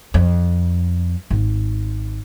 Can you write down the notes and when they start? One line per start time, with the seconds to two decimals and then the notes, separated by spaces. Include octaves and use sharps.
0.14 F2
1.31 G#1